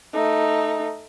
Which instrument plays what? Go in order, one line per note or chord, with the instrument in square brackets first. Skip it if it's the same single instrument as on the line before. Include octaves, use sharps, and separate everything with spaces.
[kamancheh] A3 D#4